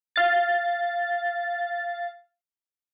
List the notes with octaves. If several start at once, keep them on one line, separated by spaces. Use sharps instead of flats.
F5 A6